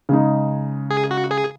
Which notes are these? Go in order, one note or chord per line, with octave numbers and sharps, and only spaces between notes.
C#3 G#3 D#4
G#4
F#4
G#4